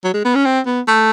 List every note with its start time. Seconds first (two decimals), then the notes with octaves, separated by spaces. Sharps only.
0.04 F#3
0.14 G#3
0.25 B3
0.35 C#4
0.45 C4
0.66 B3
0.87 A3